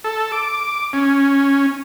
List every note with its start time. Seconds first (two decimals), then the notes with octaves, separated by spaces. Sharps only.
0.04 A4
0.32 D6
0.93 C#4